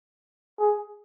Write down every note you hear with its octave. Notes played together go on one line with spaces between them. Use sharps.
G#4